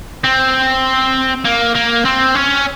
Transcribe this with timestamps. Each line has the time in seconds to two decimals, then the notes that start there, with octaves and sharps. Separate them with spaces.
0.24 C4
1.45 A#3
1.75 A#3
2.05 C4
2.35 C#4